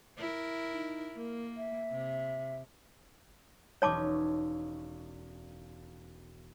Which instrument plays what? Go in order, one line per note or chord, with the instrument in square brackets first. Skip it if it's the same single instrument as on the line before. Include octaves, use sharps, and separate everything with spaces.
[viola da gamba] E4 A#4
[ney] D#4
[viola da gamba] A#3 [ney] A#4
[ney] E5
[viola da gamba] C3
[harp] E1 C#4 D#4 [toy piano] C#5 A5 D6